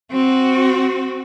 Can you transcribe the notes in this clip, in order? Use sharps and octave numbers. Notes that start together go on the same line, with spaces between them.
C4 F#4